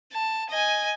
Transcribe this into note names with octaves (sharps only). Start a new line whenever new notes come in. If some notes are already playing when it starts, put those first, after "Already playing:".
A5
D#5 G#5